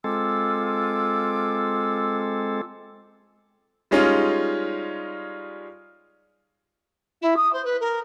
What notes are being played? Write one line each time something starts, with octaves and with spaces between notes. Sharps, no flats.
G#3 C4 F4 A4 D6 E6
G3 G#3 C#4 D#4 F4
E4
D#6
C5
B4
A#4